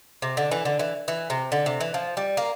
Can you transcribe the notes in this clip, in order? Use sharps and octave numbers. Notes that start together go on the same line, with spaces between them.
C3
D3
E3
D3
E3
E3
C3
D3
C3
E3
F3
G3
A#3